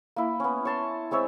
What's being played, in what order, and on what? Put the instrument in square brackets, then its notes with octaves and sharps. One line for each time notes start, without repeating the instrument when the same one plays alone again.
[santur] A#3 E4
B3 C#4
C#5 A5 C6
G#3 C4 C#5 E5